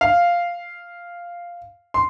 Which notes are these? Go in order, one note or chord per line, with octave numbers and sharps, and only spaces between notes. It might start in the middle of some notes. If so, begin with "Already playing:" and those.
F5
C6